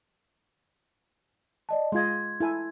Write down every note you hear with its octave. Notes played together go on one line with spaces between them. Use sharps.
D5 D#5 A5
G#3 F4 D#5 C6 G#6
E4 A4 G#5